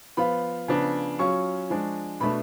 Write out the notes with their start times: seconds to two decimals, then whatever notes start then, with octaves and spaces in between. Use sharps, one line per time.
0.17 F3 B3 F4 B5
0.68 C#3 F3 B3 D4
1.19 F#3 C#4 F4 C#6
1.70 F3 G#3 D4
2.20 B2 A3 D4 B5